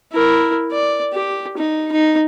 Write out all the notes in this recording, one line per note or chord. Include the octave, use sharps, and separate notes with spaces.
E4 A#4
D5
G4
D#4
D#4